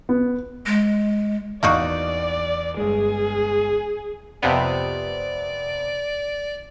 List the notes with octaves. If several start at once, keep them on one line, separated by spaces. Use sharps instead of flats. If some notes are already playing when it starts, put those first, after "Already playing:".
B3
G#3
E2 A#3 D#4 F#4 D5
G1 G#3 G#4
F2 C3 B3 D5